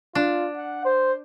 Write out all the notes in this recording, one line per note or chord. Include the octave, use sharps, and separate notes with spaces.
D4 F4
F#5
C5